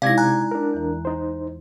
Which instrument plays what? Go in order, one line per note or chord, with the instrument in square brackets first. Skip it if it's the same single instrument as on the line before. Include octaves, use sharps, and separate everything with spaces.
[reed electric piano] C3 D5 G#6 [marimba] G#3 D#4 E4 [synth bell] F5 A#6
[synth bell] G#5 A#5 F#6
[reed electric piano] D4 A#4
[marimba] E2 E3
[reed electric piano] D#4 C5